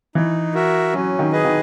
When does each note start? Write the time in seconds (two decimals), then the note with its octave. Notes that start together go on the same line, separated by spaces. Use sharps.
0.15 E3 D#4
0.54 F#4 A#4 E5
0.93 F#3 C#4
1.19 D#3
1.33 G#4 B4 D#5
1.45 D#3